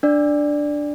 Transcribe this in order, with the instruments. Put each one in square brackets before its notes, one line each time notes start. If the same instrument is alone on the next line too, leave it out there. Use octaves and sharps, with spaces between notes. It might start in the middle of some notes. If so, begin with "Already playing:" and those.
[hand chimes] D4 D5